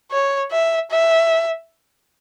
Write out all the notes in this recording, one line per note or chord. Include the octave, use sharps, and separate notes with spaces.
C#5
E5
E5